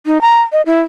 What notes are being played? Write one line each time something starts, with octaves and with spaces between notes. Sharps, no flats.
D#4
A#5
D#5
E4